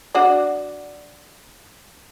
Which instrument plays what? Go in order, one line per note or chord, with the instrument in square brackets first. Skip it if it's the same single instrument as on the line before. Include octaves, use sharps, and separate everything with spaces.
[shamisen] D4 F#4 D5